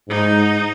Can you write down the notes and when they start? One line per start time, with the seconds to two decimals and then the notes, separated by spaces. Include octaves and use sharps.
0.09 G#2 D#4